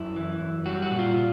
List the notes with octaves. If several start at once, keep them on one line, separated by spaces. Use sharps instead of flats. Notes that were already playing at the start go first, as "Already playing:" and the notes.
Already playing: F#2 E4
E3
F#2
G3 F#4
F#4
A#2
F4
A#2